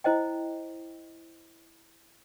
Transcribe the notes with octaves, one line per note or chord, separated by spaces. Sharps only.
E4 C5 D#5 G5